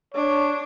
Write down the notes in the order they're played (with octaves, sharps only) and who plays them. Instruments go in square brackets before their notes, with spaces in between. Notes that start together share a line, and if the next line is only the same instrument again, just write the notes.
[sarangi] D4 [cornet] C#5